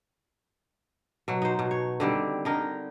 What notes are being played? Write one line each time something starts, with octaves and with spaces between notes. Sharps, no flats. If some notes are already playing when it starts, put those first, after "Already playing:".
B2 F#3
D#4 C5
B2
C#5
D3 D#3 G3 C4
D3 D#4 A#4